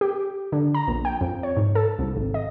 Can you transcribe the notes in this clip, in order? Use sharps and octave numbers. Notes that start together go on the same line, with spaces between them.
G4
D3
A#5
A#1
G5
F2
C#5
G#2
A4
C2
G#1
D#5